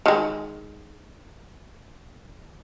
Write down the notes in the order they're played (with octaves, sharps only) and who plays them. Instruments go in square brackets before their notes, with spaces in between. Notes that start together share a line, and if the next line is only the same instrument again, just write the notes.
[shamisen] D#3 G#3